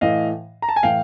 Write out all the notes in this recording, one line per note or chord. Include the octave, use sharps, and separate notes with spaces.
A2 E3 D#5 F5
A#5
A5
G#5
A2 E3 F5 G5